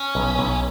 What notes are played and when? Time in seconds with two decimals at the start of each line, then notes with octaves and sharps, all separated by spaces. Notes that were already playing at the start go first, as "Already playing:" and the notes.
Already playing: C#4
0.15 B1
0.39 B1